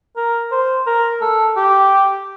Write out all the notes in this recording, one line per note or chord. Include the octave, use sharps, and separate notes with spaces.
A#4
C5
A#4
A4
G4